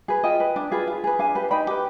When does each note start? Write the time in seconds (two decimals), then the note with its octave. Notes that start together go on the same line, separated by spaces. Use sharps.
0.08 G#4 B4
0.24 F4 D#5 G5
0.40 B4
0.56 D4
0.72 F4 G#4 B4
0.87 F4
1.04 G#4 B4
1.19 D4 F5 G#5
1.35 G4 B4
1.51 D#4 G5 B5
1.67 G4 B4